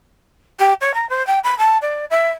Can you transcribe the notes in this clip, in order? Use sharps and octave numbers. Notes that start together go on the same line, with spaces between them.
G4
C#5
A#5
C5
G5
B5
A5
D5
E5